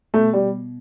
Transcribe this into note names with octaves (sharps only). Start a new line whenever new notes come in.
B2 A3
G3